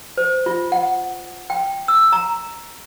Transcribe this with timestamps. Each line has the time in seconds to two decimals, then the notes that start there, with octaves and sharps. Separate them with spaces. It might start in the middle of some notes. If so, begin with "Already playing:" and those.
0.17 C5
0.46 F4
0.72 F#5
1.50 G5
1.88 E6
2.12 A#5